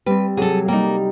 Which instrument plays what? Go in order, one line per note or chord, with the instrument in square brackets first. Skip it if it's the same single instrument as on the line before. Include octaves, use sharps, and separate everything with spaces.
[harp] G3 C4 [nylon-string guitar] B4
[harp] C3 F#3 [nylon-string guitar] G#4 A4
[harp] G3 D#4 [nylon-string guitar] A#3